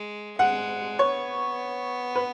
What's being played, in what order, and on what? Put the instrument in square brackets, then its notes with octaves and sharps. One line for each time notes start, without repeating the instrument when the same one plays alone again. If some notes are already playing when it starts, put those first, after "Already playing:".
Already playing: [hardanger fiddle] G#3
[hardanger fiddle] G#3 [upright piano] F#5
[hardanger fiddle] B3 [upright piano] C#5
[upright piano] B4